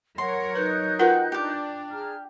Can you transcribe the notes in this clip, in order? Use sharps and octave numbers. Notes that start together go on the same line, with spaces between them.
F#3 A#4 C#5 F#5 C6
D#4 B4 F#6 G6
F4 F#4 A#4 B4 G5
D4 G4 D6
G#4 A#5 F6